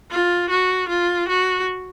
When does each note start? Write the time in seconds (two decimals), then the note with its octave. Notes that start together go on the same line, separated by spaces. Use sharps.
0.11 F4
0.50 F#4
0.89 F4
1.28 F#4